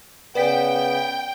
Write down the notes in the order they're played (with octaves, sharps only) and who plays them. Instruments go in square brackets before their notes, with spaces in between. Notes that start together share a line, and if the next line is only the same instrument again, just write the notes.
[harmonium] C#3 [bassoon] B3 [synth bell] B4 D5 B6 [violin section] G5